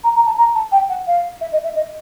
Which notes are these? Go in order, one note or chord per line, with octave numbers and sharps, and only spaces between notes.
A#5
A#5
A5
A#5
A5
G5
F#5
F5
E5
D#5
E5
D#5